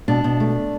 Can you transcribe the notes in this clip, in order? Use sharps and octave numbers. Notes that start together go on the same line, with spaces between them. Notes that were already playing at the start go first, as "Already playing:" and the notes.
B2 D4
B2
A3